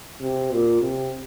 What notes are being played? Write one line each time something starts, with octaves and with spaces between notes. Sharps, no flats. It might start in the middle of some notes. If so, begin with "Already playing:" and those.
C3
A#2
C3